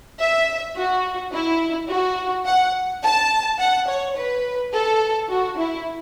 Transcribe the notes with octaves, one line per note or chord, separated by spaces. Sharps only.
E5
F#4
E4
F#4
F#5
A5
F#5
C#5
B4
A4
F#4
E4